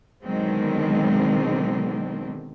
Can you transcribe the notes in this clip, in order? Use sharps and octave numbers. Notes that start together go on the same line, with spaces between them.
B2 D3 D#3 F#3 G#3 C4